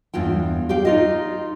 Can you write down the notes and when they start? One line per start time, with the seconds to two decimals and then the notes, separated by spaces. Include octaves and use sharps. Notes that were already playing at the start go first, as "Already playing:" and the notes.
0.14 E2 G2 F4 G5
0.69 G4 F5 G5
0.85 D#4 F4 D#5